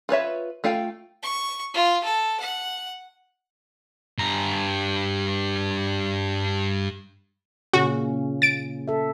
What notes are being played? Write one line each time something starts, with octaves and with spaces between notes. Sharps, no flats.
F4 B4 C#5 E5
A3 F4 F5 G5
C#6
F4
A4
F#5
G2 A#5
A#2 C#3 C#4 F#4
A6 D7
A4 E5